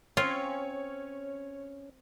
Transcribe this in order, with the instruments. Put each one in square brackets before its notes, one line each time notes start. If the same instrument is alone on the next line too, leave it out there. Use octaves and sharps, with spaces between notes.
[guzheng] C4 [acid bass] C#4 [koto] F4 [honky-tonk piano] C#5